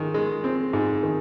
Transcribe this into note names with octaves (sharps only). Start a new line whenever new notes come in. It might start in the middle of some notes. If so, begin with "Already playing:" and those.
Already playing: G#2 D#3
G#3
C4
G#2
D#3